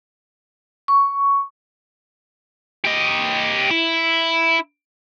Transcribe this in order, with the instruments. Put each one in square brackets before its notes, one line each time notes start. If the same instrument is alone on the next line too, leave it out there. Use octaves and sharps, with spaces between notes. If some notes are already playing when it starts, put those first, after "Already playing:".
[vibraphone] C#6
[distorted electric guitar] G4 D#5
E4